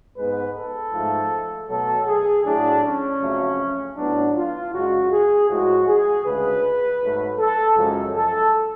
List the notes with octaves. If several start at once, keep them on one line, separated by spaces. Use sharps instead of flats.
G#2 G#3 B3 B4
A4
G#2 F3 A3
B2 F#3 A3 A4
G#4
A2 F#3 A3 D4
C#4
F2 C#3 F#3 A3
A2 F#3 B3 D4
F4
F#2 C#3 G#3 F#4
G#4
A2 F3 G#3 F#4
G#4
D2 C#3 G#3 B4
G#2 F#3 A3
A4
F#2 C#3 F3 G#3
A4